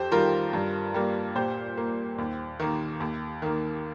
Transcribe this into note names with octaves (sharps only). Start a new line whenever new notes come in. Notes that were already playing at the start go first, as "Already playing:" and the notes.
Already playing: F2 G4 C5
D#3 G3 F4 A#4
G2
G3 A#3
A#2 G4 C5
A#3
D#2
D#3 A#3
D#2
D#3 A#3